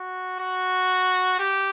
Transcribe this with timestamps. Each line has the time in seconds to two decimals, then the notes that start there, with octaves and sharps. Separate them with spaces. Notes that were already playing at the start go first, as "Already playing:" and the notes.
Already playing: F#4
0.40 F#4
1.39 G4